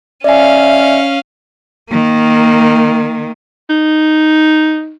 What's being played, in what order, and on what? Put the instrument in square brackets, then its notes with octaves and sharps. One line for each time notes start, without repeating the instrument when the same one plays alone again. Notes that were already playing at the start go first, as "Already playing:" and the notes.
[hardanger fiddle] C#4 F5 [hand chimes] D5 G#5 [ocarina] E5
[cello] D#3 A#3
[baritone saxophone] D#4